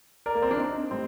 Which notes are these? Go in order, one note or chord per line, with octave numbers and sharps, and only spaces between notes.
A#4 D5
A#3
C4
D4
C4 D#4
A2 G3 C4